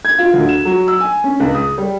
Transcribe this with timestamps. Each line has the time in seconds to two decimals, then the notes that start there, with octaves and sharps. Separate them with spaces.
0.05 G#6
0.18 F4
0.34 D2
0.49 E7
0.65 F#3
0.88 E6
1.00 G#5
1.24 C#4
1.40 C#2
1.55 D#6
1.78 G3